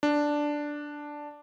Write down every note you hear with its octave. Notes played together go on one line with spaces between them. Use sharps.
D4